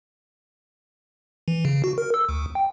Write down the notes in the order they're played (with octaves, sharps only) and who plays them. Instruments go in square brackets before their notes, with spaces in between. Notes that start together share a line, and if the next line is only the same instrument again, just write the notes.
[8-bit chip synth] E3
C#3
F#4
A#4
E6
D2
G5